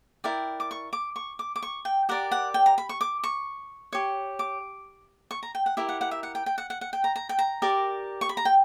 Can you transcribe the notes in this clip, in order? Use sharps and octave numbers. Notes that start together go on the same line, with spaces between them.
E4 A#4 D5 G5
D6
C#6
D6
C#6
D6
D6
C#6
G5
G4 A#4 D5 F#5
F#5
G5
A#5
B5
C#6
D6
C#6
G4 C#5
D6
C#6
A#5
G5
F#5
E4 G4 A#4 E5
F#5
F#5
E5
F#5
G5
G5
F#5
F#5
F#5
G5
A#5
A#5
G5
A#5
G4 A#4 D5
C#6
B5
A#5
G5